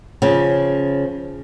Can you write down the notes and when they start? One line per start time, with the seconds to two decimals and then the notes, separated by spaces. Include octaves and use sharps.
0.22 C#3 F3